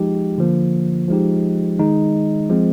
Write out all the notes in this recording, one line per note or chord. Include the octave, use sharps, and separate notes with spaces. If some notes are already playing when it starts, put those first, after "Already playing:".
Already playing: F3 G#3 D#4 G4
D3 F3 A#3
F3 G#3 D#4 G4
D#3 G#3 D#4
F3 G#3 C4